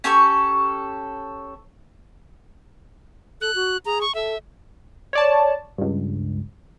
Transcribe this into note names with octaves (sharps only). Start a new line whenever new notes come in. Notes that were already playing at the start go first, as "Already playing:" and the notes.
C#4 G4 A4 C#6
A4 F#6
F#4
G#4 A#5
C#6
A4 E5
C#5 D5 A5
C#2 G2